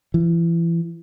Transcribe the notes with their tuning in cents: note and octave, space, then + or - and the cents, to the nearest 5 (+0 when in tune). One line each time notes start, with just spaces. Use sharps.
E3 +30